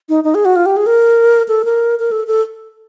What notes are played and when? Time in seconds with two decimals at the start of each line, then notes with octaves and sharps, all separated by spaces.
0.09 D#4
0.24 D#4
0.35 G#4
0.45 F#4
0.56 F4
0.66 G4
0.77 G#4
0.86 A#4
1.49 A4
1.65 A#4
1.99 A#4
2.11 A4
2.27 A4